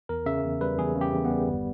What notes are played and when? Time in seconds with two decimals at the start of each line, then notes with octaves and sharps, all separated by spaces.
0.09 E2 A#4
0.26 C#3 E5
0.44 E2
0.61 G3 B4
0.78 E2 G#4
0.96 C#3
1.01 G4
1.13 E2
1.25 B3
1.30 G3
1.48 G1